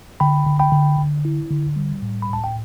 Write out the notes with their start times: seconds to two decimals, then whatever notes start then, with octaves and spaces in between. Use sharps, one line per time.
0.20 D3 G5 B5
0.46 D3
0.59 G5 B5
0.72 D3
0.99 D3
1.25 E4
1.51 D3
1.76 G3
2.02 A2
2.22 B5
2.29 A2 A5
2.44 G5